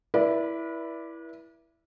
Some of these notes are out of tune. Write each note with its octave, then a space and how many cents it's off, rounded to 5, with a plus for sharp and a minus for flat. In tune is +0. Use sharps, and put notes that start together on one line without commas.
E4 +5 B4 -40 D5 +0